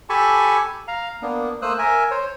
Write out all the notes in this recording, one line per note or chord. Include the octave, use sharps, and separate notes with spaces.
G4 A4 G#5 A5 B5 C#6
F5 A#5
A#3 B3 D4
A3 A#3 C5 D#6 E6 F#6
A#4 E5 G#5
C5 C#5